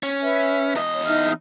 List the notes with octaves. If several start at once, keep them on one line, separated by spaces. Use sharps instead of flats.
C#4
B4 E5
E2 D#5
C#5
D#4 E5 F6